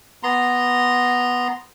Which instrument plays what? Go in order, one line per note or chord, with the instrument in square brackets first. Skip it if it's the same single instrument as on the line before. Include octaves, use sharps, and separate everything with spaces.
[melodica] B3 A#5 C6